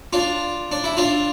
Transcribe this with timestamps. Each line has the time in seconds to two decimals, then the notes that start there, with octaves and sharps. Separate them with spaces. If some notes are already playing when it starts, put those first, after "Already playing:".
0.13 D4 F4
0.72 D4
0.84 E4
0.97 D4 F4